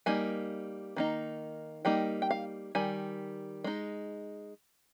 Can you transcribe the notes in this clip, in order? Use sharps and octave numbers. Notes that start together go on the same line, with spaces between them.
G3 A#3 D#4 G#5
D#3 A#3 D#4
G3 A#3 D#4 G5
G5
F5
D#3 G3 G#5
G#3 D#4